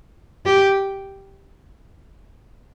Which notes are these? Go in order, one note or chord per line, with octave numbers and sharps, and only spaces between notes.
G4